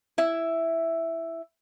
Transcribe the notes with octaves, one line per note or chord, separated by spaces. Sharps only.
E4 E5